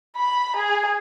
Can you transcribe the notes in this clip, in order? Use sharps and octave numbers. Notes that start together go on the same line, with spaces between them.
B5
G#4